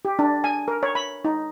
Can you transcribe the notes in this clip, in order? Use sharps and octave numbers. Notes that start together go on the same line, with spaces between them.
G4
D4
G#5
A#4
C#5
B5
D#4